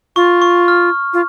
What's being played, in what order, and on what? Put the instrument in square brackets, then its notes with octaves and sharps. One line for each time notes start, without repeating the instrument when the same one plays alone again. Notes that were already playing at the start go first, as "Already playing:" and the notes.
[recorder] F4 [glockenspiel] C#6
[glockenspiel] C#6
F6
[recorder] F4